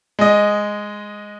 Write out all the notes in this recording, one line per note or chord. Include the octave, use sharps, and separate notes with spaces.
G#3 D#5